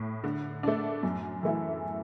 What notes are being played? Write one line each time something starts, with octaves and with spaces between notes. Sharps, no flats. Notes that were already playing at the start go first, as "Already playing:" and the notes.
Already playing: A2
D3
A3 D4
F#2
E3 A3 E4